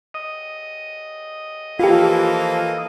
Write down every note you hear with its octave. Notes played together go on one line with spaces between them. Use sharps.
D#5
E3 F3 A#3 F4 G4 A4 F5